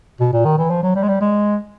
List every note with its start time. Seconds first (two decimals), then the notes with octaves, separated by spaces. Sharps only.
0.20 B2
0.33 A#2
0.45 D#3
0.58 E3
0.70 F3
0.83 F#3
0.95 G3
1.03 G#3
1.08 G3
1.21 G#3